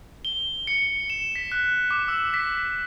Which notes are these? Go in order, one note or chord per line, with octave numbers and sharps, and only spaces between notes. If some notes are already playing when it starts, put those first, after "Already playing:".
G7
C#7
E7
B6
F#6
D6
E6
B6